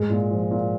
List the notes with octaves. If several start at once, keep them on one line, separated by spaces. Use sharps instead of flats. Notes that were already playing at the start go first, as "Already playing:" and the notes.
Already playing: G#2 G#3
A#2
F3
A#2